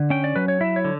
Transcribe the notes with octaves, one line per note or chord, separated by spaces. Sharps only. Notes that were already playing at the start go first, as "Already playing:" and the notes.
Already playing: D3
C#4 G5
D5
F#3 B4
C#5
E4 E5
C#5
D3